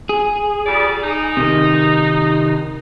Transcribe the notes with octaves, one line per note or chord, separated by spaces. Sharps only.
G#4
F2 G3 D5
D#4
C3 D#3